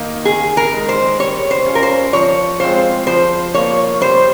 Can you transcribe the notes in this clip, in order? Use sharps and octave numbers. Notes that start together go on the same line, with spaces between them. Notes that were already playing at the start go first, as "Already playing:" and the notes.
Already playing: D#3 A#3 D#4
D#3 G#4
A#4
G#3 D#4
C5
G3 C#5
C5
C#4 F4
A#4
C5
F3 C#5
G#3 C4 F4 C5
F3 C5
A#3 F4 C#5
G3 C5